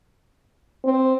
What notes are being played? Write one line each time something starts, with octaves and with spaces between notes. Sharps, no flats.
C4